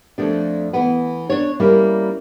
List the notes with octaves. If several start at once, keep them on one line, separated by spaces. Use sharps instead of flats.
F2 A3 D4
E3 B3
D4 C#5
G3 A#3 C#4 E4